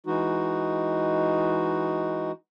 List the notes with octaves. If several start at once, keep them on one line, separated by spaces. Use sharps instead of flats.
E3 G#3 D#4 F#4